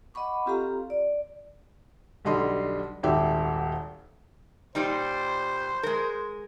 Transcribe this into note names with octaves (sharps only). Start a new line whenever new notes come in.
D#5 F#5 B5 C#6 D6
C4 F4 G4 A4 F5 A#5
D5
B1 D3 G3 D#5 C6
D#1 G#1 G4 E5
A#2 G3 D#4 C5
G#3 A#4